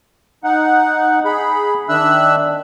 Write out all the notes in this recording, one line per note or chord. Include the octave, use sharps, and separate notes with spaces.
D#4 F#5
G#4 B5
D#3 D4 E5 E6 F#6